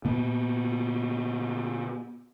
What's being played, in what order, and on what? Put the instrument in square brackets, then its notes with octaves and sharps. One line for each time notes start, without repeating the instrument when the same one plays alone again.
[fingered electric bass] A#2 B3